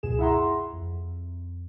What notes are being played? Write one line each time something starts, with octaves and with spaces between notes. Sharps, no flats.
C#2 F#2 B2 G#4 E7
E4 G#4 E5 F#5 A#5 C6
F2